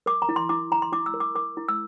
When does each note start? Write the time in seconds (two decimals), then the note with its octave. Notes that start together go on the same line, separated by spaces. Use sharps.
0.06 A#4 D6
0.22 A#5
0.29 E4
0.36 C6
0.49 E4 D6
0.71 E4 A#5
0.82 C6
0.92 E4 D6
1.06 E6
1.14 A#4
1.20 D6
1.35 A#4 D6
1.57 E4
1.69 E6